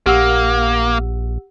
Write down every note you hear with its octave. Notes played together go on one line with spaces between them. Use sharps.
A#1 A#3 G4 F#5 E6